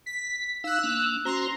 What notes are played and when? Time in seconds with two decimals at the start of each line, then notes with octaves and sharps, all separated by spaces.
0.06 B6
0.64 D#4 F5 E6 F#6
0.83 A#3 D4
1.25 C#4 F#4 C5 A#5 C6